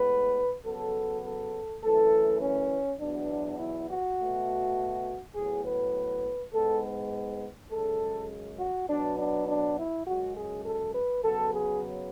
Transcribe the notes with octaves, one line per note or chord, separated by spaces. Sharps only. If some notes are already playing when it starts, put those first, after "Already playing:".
Already playing: A2 G#3 B3 B4
C#3 F#3 B3 A4
A4
F#2 E3 A3 A4
C#4
E2 B2 F#3 B3 D4
E4
F#4
B2 A3
A2 F#3 B3 G#4
B4
G#2 G#3 B3 A4
F#2 C#3 G#3 A4
F#4
B2 F#3 B3 D4
D4
D4
E4
F#2 C#3 G#3 F#4
G#4
A4
B4
C#3 F#3 B3 A4
G#4